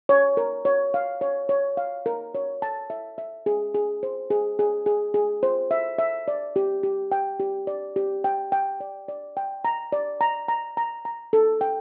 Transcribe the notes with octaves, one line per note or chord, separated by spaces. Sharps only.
C#5
A#4
C#5
F5
C#5
C#5
F5
A#4
C#5
A5
E5
E5
G#4
G#4
C5
G#4
G#4
G#4
G#4
C5
E5
E5
D5
G4
G4
G5
G4
D5
G4
G5
G5
D5
D5
G5
A#5
D5
A#5
A#5
A#5
A#5
A4
G5